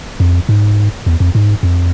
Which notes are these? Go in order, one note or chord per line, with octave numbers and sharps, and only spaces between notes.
F2
G#2
E2
F2
G#2
F2